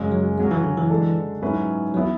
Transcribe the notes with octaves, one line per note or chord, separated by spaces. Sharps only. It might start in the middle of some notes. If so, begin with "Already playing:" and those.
Already playing: F#2 C#3 G#3
F#3
C#3 F#3 G#3 C#4 F#4
E3
D3
E3
D3 G#3 D4 A4
G#2 F#3 C#4 E4 B4
E3 F#3 B3 E4